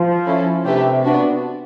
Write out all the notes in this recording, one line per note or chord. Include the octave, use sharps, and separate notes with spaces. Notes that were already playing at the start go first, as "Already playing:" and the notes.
Already playing: F3
C#4 E4 A4
C3 A3 D4 G4 B4 E5
B3 D4 F#4